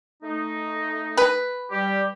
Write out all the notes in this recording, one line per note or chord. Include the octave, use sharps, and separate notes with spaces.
A3 D#4
B4
G3 G4